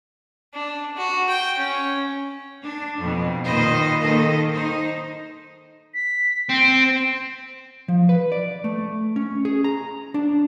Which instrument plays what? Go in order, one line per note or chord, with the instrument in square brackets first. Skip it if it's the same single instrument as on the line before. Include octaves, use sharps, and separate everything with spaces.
[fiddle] D4
F#4
G5
C#4
[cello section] D4
F2 B2
A#2 D#3 B4 C5 D#5
D#3 A#3 A4 D#5
D#4 C5
[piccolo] B6
[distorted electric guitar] C4 [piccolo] D7
[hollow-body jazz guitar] F3
B4
D5
A3
C#4
G#4
A#5
D4